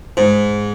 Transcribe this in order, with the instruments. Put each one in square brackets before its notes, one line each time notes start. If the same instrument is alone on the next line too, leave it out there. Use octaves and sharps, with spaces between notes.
[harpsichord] G#2